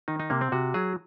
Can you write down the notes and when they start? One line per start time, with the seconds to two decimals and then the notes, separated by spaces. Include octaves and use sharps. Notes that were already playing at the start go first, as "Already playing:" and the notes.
0.08 D#3 D#4
0.20 D#4
0.30 C3 A#3
0.41 C4
0.52 C3 F#4
0.74 F#3 G#4